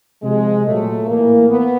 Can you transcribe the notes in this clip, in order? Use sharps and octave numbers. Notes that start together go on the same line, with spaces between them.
C3 F3 G#3
A#2 F#3 A3
A2 E3 A#3
B3